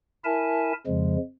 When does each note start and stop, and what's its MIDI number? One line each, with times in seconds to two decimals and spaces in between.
0.24 0.73 64
0.24 0.73 70
0.24 0.73 76
0.24 0.73 80
0.24 0.73 81
0.87 1.17 41
0.87 1.17 49
0.87 1.17 53
0.87 1.17 56